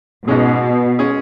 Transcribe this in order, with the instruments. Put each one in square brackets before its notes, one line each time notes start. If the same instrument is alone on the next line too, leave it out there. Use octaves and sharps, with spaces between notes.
[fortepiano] G#2 G#3 C#4 G#4 [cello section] B2
[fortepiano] G#3 C#4 G#4